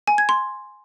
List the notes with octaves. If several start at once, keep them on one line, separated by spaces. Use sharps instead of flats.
G#5
G#6
C6